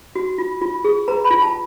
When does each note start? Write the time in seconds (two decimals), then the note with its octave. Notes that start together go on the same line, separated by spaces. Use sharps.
0.16 F#4
0.38 F4
0.62 F4
0.84 G#4
1.08 B4 A#5
1.24 B5
1.30 F4
1.42 A5